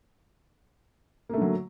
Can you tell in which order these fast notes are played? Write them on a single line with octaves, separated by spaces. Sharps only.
A#3 A3 D3 F#3